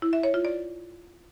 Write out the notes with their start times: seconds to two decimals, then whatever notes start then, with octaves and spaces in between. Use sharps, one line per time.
0.02 E4
0.13 E5
0.23 C#5
0.34 F4
0.45 D5